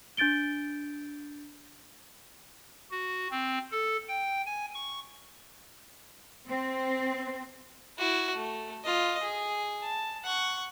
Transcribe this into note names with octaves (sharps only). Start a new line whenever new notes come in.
D4 G6 A6 D7 G7
F#4
C4
A4
G5
G#5
C#6
C4
E4 F#4
A3
F4 D#5
G#4
A5
F#5 C#6